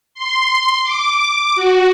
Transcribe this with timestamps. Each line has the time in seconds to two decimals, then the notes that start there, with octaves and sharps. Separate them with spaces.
0.14 C6
0.84 D6
1.55 F#4